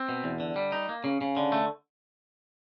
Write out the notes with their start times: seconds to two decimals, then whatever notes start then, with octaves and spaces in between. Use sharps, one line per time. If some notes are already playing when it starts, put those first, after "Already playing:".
Already playing: C4
0.09 B2
0.24 E2
0.40 D3
0.56 G3
0.72 D#4
0.89 A#3
1.04 C#3
1.21 C#3
1.37 D3
1.52 A3